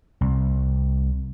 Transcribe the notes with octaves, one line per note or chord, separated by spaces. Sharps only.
C2